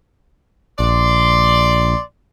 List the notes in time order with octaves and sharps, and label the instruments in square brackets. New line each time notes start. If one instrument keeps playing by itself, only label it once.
[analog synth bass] A#1 [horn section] D5 C6